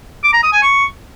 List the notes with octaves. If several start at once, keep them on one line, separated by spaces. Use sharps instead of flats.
D6
A#5
D#6
G#5
C#6